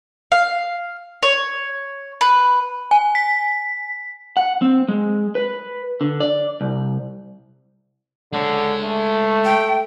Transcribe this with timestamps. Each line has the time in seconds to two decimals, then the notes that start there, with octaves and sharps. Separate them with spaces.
0.32 F5
1.23 C#5
2.21 B4
2.91 G#5
3.15 B6
4.37 F#5
4.62 C4
4.89 G#3
5.35 B4
6.01 D3
6.20 D5
6.61 C2
8.33 D3 G#3 C#5
8.83 A3
9.45 G5